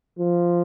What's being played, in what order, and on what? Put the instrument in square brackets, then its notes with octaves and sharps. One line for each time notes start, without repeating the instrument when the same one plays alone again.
[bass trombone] F3